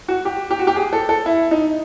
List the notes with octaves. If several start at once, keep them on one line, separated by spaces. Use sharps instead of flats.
F#4
G4
G4
F#4
G4
G#4
A4
A4
E4
D#4